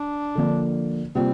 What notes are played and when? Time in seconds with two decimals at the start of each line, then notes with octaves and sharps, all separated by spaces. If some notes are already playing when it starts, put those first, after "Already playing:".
Already playing: D4
0.35 D3 F3 A#3
1.15 C3 G3 A#3 C4 F4